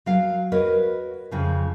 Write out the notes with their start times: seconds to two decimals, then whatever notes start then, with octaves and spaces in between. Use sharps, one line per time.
0.06 F#3 F5
0.52 F#4 A#4 B4 C#5 D#5
1.31 F2 C#3 F3